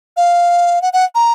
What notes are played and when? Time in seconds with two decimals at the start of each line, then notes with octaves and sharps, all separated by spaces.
0.17 F5
0.82 F#5
0.93 F#5
1.15 A#5